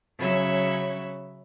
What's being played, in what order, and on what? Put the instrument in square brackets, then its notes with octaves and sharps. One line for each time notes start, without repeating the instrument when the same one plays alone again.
[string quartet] C#3 F#3 C#4 F#4 E5 B5